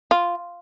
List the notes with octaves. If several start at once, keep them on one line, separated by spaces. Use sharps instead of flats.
F4